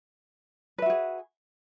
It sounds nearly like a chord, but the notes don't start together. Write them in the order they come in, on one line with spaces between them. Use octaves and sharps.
B4 E5 F#4 G#4